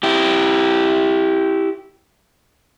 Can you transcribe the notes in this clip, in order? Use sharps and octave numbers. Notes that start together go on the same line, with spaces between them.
E4 G4